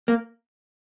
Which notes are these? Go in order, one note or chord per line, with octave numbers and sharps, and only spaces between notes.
A#3